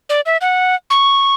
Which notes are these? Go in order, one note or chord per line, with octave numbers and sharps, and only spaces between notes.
D5
E5
F#5
C#6